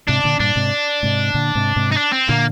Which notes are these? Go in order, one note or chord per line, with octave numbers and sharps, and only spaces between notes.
G#2 C3 D4
A#2 D3
G2 A#2 D4
G#2 C3
G#2 C3
A#2 D3
G#2 C3
G#2 C3
D#4
D4
C4
A#2 D3 A#3